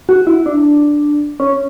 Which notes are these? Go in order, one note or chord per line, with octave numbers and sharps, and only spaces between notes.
F#4
E4
D4
C#4